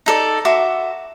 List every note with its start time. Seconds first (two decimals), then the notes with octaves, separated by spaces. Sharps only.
0.06 D#4 A4 D5
0.45 F#4 E5 C6 D6